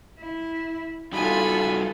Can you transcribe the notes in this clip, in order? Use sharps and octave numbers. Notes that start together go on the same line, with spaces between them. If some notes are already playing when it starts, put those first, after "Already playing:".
E4
G3 D#4 F4 F#4 A4 G#5 B5